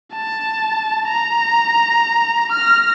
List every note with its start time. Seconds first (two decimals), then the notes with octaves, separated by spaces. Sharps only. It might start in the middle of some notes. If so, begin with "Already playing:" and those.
0.13 A5
1.08 A#5
2.53 F6 A#6